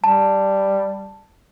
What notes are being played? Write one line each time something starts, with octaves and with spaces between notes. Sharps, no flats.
G3 A5